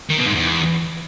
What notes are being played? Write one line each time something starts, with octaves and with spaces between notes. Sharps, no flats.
D#3
B2
G#2
E2